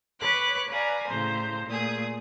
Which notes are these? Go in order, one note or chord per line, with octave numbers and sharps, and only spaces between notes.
B4 C#5 D6 F#6
B4 D5 F5 G#5 A#5
A2 C#3 C5 A#5
A#2 A3 G#4 D#6